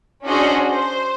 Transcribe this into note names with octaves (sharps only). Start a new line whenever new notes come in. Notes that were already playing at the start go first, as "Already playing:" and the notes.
C#4 D4 F#4 G#4 C5 D#5
C5